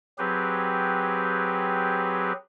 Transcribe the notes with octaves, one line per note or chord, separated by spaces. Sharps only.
F#3 C4 G4 G#4 B4